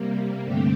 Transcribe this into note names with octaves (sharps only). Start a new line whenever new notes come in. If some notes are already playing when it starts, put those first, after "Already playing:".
Already playing: C3 G3 A#3
G2 D3 A3 C4 G4